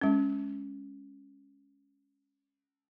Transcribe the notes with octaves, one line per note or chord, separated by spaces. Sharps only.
G#3 C#4